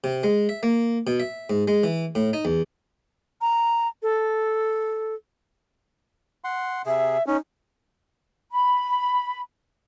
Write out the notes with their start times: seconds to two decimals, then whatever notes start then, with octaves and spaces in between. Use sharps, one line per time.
0.04 C3
0.23 G#3
0.49 E5
0.63 A#3
1.07 B2
1.20 E5
1.50 G#2
1.68 G#3
1.83 E3
2.15 A2
2.33 D#4
2.45 E2
3.41 A#5
4.03 A4
6.44 F#5 C6
6.86 C3 G#4 E5
7.27 C#4 D#4
8.52 B5